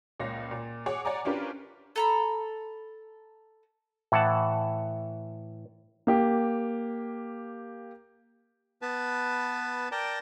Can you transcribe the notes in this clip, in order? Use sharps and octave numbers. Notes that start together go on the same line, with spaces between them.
C#2 A#2 C#5 F5 A#6
A#2
G#4 C#5 F#5 D6
C#5 D5 F#5 G#5 A#5 D6
C#4 D4 F4 G4 A#4 B4
A4 A#5 B5
A2 E3 F#5 A5
A#3 G4
B3 B4 A5
A#4 D5 G5 A5 A#5